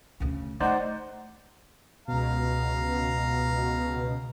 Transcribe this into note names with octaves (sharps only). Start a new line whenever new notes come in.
D2 C#3
A3 D#4 C5 D5 F#5
C#2 B2 F5 A#5